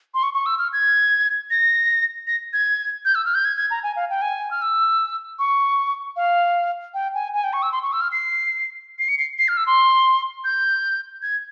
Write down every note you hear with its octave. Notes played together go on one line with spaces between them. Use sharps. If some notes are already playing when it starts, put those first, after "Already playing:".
C6
C#6
C#6
E6
F6
G#6
A#6
A#6
G#6
G6
E6
F6
G6
G#6
G#6
A#5
G#5
F5
G5
G#5
F6
E6
C#6
F5
G5
G#5
G#5
G5
C#6
E6
C6
C#6
E6
F6
C7
C7
C#7
C7
C7
F6
E6
C6
G6
G#6